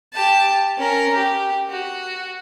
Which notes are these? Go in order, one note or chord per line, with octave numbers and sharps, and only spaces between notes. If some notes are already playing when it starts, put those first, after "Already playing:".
G4 A5
C#4 A#4
G4
F#4